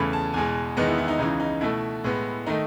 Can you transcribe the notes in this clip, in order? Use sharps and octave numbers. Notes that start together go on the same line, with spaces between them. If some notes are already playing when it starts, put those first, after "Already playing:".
Already playing: E2 C#3 E3 A3 B5
A5
E2 B2 G#3 G#5
E2 D#3 G#3 B3 D#5
E4
E4
D#4
C#2 C#3 E3 D#4
D#4
B2 A3 E4
A2 G#3 B3
D#3 A3 D#4